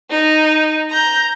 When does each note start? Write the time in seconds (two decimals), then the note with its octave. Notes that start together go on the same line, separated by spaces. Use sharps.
0.11 D#4
0.90 A#5 G6